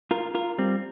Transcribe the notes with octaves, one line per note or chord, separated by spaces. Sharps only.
F4 A#4
F4 A#4
G3 C4